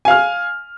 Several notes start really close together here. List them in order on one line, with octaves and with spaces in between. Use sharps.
G#5 F5 F6